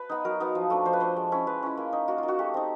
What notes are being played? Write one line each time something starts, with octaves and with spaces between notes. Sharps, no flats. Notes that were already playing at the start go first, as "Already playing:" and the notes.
Already playing: B4
B3 D#4
F#3 A#4
B3 D#4
F3
A3 D4
F3 C5
B4
A3 D4 C5
G#3
C#4 E4
G#3 B4
C#4 E4
A#3
D#4
A#3 F#4
F4
D#4
F#4
A3 G4
C4 D#4